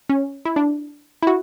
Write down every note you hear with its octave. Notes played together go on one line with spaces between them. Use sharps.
C#4
E4
D4
E4
F#4